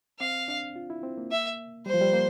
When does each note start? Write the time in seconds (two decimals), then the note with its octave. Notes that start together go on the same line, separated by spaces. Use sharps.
0.20 C4 F5
0.48 D4
0.76 F4
0.90 E4
1.03 C4
1.17 A#3
1.31 E5
1.86 G3 C5
1.94 F3
2.01 G3
2.13 A#3